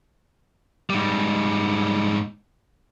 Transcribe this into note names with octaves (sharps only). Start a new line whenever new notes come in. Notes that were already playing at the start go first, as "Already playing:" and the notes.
G#2 G3